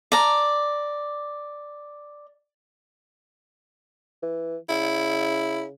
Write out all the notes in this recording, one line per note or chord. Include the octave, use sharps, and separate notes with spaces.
D5 A#5
E3
C#3 E4